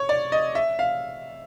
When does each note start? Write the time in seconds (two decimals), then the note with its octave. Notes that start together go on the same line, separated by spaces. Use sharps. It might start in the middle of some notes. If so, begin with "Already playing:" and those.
Already playing: C#5
0.09 D5
0.32 D#5
0.55 E5
0.79 F5